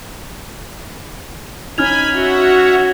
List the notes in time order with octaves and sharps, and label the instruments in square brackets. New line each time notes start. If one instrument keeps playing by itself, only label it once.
[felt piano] C#4 D#4 [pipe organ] G#5 B5 [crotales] F6 G#6 F7
[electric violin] F#4 [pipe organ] C#5 E5 F#5